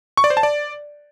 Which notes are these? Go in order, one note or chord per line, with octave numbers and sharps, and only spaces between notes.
C#6
D5
C5
A5
D5